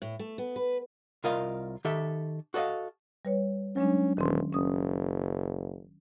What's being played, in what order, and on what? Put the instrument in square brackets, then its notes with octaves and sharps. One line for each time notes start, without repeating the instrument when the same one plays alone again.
[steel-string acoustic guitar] A2
A3
B3
B4
[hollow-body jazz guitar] C2 F4 A#4 D#5 F5
D#3 G4 A4 E5
F#4 A4 D5 D#5 F5
[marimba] G3 B4 C#5
[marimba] F#3 G#3 D4 [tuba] C#4
[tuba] E1 [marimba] D#3 C#4 C6
[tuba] F#1 [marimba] C#4 D#6